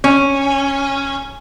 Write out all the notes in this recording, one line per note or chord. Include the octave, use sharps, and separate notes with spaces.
C#4